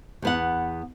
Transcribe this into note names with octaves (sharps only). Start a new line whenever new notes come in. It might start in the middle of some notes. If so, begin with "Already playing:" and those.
E2 B3 F#5